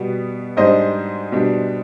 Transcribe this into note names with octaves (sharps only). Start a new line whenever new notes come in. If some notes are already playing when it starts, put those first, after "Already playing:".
Already playing: B2 G3 B3
G#2 G3 D4 C5 D#5
B2 G3 D4